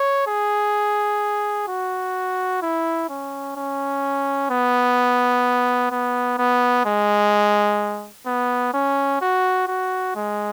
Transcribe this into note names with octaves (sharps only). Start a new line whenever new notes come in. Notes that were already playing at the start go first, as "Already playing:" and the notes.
Already playing: C#5
G#4
F#4
E4
C#4
C#4
B3
B3
B3
G#3
B3
C#4
F#4
F#4
G#3